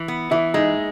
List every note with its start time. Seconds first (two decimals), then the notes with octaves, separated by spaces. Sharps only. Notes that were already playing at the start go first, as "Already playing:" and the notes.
Already playing: E3
0.08 B3
0.31 E3 E4
0.54 G#3 D#4